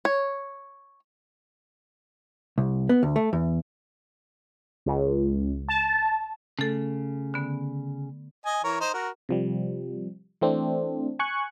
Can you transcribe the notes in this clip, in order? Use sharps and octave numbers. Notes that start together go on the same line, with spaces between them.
C#5
C2
B3
D2
A3
E2
C#2
A5
C#3 A3 A4
D3 B3
D#5 G#5
E3 A#4 C#5
D#4 C5
F#4 A#4
C3 F3 G3
E3 A3 C4 D4
G#5 C#6 F#6